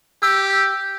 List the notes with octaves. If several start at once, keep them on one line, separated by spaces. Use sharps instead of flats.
G4 E6